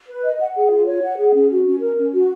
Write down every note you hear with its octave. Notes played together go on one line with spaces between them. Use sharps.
B4
D#5
F#5
G#4
F4
C#5
F#5
G#4
C#4
F#4
C#4
A#4
C#4
F#4